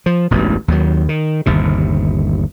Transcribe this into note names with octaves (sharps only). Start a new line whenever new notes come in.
F3
E1 A1 G2 B2
D#2 D#3 F#3
D#3
G1 D#2 C3